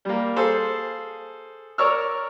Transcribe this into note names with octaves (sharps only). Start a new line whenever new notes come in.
G3 A#3
G#4 A4 C5 F5
A#4 C#5 D5 C#6 E6 F6